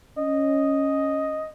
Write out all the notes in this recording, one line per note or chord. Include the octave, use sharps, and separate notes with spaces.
C#4 D#5